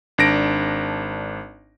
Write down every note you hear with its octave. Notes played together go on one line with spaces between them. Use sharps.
G#1 D4 A#6 D7